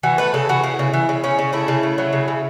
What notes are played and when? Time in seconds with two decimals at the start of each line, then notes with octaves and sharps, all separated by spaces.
0.03 E3 F#4
0.18 A3 B4
0.34 C#3 A4
0.49 E3 F#4
0.63 C#3 E4
0.79 C#3
0.93 E3
1.09 C#3
1.24 C#3 C#4
1.39 C#3
1.53 A3 E4
1.68 C#3
1.83 A3
1.98 F#3
2.13 C#3
2.28 C#3